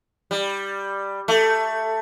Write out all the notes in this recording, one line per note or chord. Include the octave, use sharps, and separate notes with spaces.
G3
A3